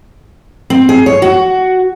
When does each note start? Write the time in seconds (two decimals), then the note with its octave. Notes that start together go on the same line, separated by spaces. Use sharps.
0.70 C4
0.89 G#4
1.06 C#5
1.22 F#4